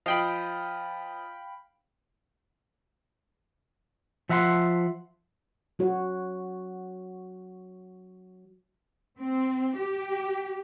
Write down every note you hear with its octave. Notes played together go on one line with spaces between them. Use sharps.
F3 D#5 F5 G5 B5
F3 E5 F#5 A#5 C6
F#3 F#4 C#5
C4
G4